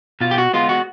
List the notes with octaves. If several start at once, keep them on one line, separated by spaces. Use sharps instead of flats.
B2 F4
G4
F#4
G#3 B3 F4
F#4